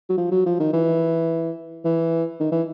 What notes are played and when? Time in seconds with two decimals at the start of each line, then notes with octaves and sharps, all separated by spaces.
0.09 F#3
0.18 F3
0.31 F#3
0.46 F3
0.60 D#3
0.73 E3
1.85 E3
2.40 D#3
2.52 E3